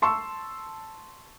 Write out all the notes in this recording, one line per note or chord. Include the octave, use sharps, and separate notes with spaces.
A5 C6 C#6 E6